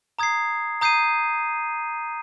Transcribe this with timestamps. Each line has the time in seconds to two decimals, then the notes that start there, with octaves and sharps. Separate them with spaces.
0.19 A#5 D#6 G#6 C7
0.81 A#5 D#6 G6 C7 D#7